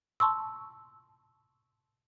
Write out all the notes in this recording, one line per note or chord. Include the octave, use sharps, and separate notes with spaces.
A5 C6 C#6 E6